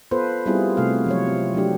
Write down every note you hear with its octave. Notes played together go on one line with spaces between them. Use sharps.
B3 F4 A4 B4 C5
G3 B3 C4 E4 F4 G#4
C3 A3 F#4 F5
F3 F#3 C#5
C4
F#3 A3 D4 G4